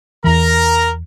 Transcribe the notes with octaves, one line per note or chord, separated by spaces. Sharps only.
E2 E3 A#4 A#5